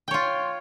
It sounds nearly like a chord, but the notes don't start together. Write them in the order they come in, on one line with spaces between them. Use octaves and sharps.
G5 C#5 F4